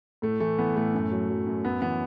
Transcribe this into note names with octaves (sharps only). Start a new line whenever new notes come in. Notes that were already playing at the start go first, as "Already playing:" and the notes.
A2 A3
E3 A3
E3 B3
A2 A3
F#2
F#3
F#3
F#2
F#2 B3
E3 B3